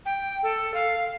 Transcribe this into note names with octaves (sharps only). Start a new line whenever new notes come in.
G5
A4
F5